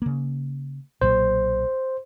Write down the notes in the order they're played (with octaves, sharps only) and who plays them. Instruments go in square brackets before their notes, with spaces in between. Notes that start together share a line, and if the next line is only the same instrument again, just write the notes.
[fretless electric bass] C#3 A#3
[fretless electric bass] B1 A#2 F#3 [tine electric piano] C5